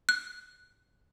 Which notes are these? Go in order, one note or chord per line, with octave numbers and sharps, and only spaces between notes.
F#6